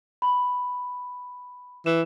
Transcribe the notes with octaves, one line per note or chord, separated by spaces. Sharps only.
B5
E3 E7